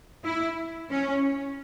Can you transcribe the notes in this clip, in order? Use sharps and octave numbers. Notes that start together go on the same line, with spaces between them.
E4
C#4